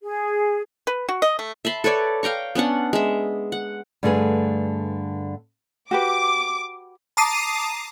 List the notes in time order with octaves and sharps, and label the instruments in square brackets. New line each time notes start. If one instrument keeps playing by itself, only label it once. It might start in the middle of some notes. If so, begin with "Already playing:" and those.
[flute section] G#4
[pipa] B4
F#4
D#5
A3
[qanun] E5 A5 B5 C6
A4 B4 C#5 D5
F5 G5 A#5 C#6
B3 C#4 D4 F#5
G#3 E5
F#5
[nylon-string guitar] G2 D3 A3 F4 G#4 B4
[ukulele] F#4 G4 B4 [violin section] D6
[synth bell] A5 A#5 D6 D#6 C7 D#7